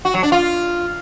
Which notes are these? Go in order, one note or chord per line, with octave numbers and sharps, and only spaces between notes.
F#4
F#3
D4
F4